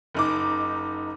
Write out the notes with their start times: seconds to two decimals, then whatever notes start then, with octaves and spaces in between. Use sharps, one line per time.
0.14 F#1 D#4 D6